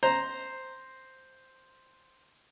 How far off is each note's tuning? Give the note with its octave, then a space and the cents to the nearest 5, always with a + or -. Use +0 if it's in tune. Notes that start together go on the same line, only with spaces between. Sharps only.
C5 +0 A#5 +0